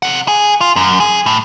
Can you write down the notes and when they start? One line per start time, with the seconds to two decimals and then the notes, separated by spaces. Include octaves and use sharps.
0.02 C3 F#5
0.28 G#4
0.61 F4
0.76 F#2
1.00 G#4
1.26 A2